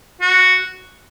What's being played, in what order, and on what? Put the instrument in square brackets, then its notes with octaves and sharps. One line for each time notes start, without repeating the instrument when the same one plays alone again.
[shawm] F#4